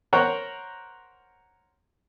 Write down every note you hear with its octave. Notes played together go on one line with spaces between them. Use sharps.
A#4 C5 C#5 F#5